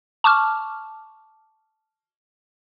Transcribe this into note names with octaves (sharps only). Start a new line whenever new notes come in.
A5 C#6 D6 F6